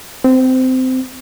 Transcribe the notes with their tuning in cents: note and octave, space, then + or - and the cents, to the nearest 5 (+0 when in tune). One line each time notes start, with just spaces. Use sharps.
C4 -20